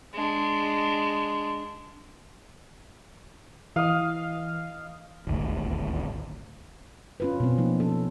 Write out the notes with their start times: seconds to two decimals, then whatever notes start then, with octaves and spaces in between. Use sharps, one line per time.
0.14 G#3 D4
3.76 E3 D#5 F5
5.27 D#1 G#1 D2
7.20 C#4 F4 B4
7.40 B2 C4
7.58 F3 A#3 D#4
7.80 C#4 A4